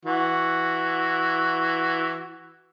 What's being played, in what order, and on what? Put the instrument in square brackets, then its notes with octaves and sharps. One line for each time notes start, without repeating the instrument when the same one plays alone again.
[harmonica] E3 F#4